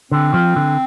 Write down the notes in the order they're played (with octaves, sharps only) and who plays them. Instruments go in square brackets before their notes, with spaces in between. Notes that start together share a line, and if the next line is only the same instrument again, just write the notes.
[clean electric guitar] D3 [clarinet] C4
[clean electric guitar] F3
D3